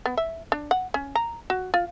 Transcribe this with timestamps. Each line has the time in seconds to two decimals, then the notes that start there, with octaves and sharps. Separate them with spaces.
0.06 B3
0.17 E5
0.52 D4
0.71 F#5
0.94 C#4
1.15 A#5
1.50 F#4
1.74 F4